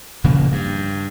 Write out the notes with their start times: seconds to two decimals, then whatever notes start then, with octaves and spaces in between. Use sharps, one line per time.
0.24 D#1 C#3 F3 A#3
0.52 G2